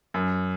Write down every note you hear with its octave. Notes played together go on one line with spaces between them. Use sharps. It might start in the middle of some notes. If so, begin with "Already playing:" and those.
F#2